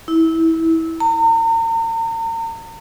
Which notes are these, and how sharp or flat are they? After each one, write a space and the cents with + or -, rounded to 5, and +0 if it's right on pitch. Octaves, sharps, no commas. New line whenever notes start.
E4 -20
A#5 -40